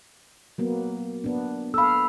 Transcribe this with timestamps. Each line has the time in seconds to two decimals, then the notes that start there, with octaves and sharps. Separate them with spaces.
0.58 F#3 A#3 B3
1.24 B3 D4
1.74 A4 F5 B5 E6